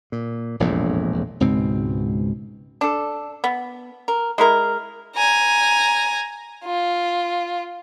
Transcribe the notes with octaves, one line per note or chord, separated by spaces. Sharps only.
A#2
E1 A#1 F2 A2
C#2 G#2 B2 C4
D4 A4
B3
A#4
G#3 E4 A#4
G#5 A#5
F4